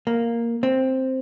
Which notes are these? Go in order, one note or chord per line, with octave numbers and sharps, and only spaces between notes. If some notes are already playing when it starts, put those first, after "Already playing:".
A#3
C4